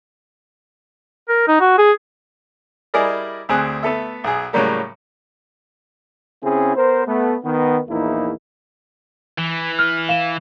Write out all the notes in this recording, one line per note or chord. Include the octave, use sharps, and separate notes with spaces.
A#4
D#4
F#4
G#4
G3 E4 G#4 A#4 D5 D#5
D2 C4 G#4 F#6
A3 B3 A4 E5
B1 G#4
A2 C#3 F#3 G3 A#3
C#3 C4 C#4 E4 G#4
B3 A#4 C5
A3 B3
D#3 B3
A#1 E2 A#3 D#4 E4
E3
F6
F5 E7